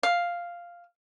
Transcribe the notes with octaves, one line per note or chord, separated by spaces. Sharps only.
F5